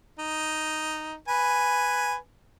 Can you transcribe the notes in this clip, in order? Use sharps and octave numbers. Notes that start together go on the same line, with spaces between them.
D#4
B4 G#5